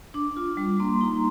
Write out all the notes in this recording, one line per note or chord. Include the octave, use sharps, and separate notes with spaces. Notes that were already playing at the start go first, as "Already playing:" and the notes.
D4 D6
F4
G3
A#3 C6
D#4 A#5